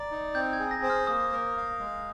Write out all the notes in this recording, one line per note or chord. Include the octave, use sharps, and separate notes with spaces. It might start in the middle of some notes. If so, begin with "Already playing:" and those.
Already playing: D5 A#5
D#4
C4 G6
G6
G#6
G#4
A#6
C5
F6
A#3 D#6
A#4
F5
G#3